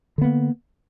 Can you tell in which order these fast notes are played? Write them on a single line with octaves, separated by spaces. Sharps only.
D3 B3 A#3